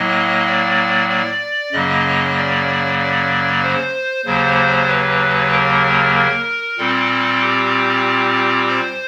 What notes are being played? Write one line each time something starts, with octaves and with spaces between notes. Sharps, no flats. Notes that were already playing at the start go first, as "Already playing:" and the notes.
Already playing: A2 F#3 A#3 D#5
D5
D5
F#2 C#3 F#3 A#3 D#5
D5
D5
C5
D#2 C#3 F#3 A#3 C5
B4
A#4
A#4
A#2 G3 C4 A4
G4
C5